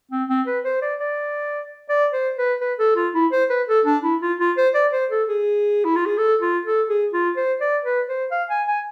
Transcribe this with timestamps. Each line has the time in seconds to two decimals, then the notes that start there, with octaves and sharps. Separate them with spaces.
0.11 C4
0.29 C4
0.47 B4
0.64 C5
0.82 D5
1.00 D5
1.89 D5
2.13 C5
2.37 B4
2.61 B4
2.79 A4
2.96 F4
3.14 E4
3.32 C5
3.50 B4
3.67 A4
3.85 D4
4.03 E4
4.21 F4
4.40 F4
4.57 C5
4.74 D5
4.92 C5
5.11 A4
5.28 G#4
5.85 E4
5.96 F4
6.06 G#4
6.18 A4
6.41 F4
6.65 A4
6.89 G#4
7.13 F4
7.36 C5
7.61 D5
7.84 B4
8.08 C5
8.31 F5
8.50 G#5
8.68 G#5